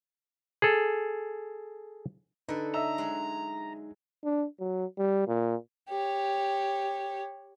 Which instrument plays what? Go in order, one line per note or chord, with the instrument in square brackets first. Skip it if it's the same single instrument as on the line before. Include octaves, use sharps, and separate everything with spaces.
[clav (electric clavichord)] G#4 A4
[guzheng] D3 A4 [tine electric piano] D#4 [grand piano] B4
[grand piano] D#5 E5 E6 [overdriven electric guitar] A#5
[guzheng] F#3 G#3
[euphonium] D4
F#3
G3
A#2
[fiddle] G4 C#5